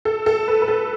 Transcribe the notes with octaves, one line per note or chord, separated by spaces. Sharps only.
A4
A4
B4
B4
A4